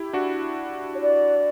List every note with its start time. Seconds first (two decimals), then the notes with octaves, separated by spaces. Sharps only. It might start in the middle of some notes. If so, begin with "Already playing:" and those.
Already playing: E4 G4
0.13 D4 F#4
0.95 C#5
1.01 D5